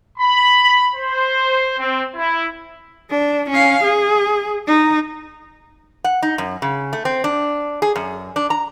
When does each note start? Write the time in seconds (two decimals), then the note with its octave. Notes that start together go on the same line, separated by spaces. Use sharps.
0.18 B5
0.94 C5
1.78 C4
2.16 E4
3.10 D4
3.50 C#4 F5
3.84 G#4
4.67 D#4
6.04 F#5
6.23 D#4
6.38 F#2
6.62 C#3
6.93 A3
7.05 C4
7.24 D4
7.82 G#4
7.96 F#2
8.36 D4
8.50 A#5